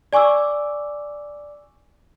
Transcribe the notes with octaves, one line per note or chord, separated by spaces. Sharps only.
D5 G#5 C#6 D6 E6